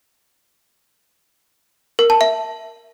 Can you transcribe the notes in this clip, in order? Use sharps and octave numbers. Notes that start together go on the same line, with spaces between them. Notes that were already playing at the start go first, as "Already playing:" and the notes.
A#4
A5
E5